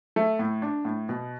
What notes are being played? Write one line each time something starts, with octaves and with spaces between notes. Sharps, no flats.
A3
A2
D4
A2
B2